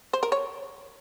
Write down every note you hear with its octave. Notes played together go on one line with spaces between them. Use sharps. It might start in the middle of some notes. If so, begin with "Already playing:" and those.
C5
A#4
C#5